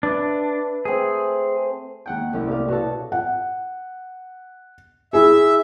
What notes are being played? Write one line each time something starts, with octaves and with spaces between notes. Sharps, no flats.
D4 B4 E5
A3 C4 G#4
D#2 F#5 G5
C2 A3 C#4 E4
C3 A3 A#3 D5 F5
B2 F#4 A4 C#5 A5
F#5
E4 G#4 E5